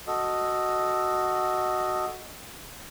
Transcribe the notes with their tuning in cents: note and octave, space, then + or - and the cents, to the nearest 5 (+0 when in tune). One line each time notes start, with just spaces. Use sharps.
F#4 +0 A4 +0 D#5 +0